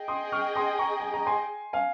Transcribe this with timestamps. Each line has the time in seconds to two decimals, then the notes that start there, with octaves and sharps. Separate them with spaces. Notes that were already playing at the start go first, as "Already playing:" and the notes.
Already playing: G#4 D#5 G5
0.08 C6 D#6
0.32 C#6 F6
0.56 C6 D#6
0.79 A#5 C#6
1.00 G#5
1.14 A#5
1.27 G#5 C6
1.73 F5 G#5